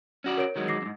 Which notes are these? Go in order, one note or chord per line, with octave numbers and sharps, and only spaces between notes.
C#4 F#4 D5
A#4 C#5 D7
D#3 F#3 G#3
D6 A#6 C7
F2 G#2